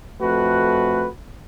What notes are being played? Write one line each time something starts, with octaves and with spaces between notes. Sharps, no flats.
F2 A3 F#4 B4